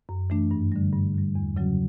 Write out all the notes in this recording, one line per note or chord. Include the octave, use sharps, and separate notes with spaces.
F#2
E3 A3 D4
G2
D3 G3
G2
D3 G3
E2
C#3 F#3 C#4 F#4